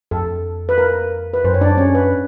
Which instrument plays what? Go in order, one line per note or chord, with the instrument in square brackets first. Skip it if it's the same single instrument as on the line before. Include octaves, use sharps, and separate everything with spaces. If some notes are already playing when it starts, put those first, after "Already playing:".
[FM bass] F2 [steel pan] A4
[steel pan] B4
A#4
B4
[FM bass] F#2 [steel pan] C5
[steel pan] C#5
D4 D5
C#4 C#5
B4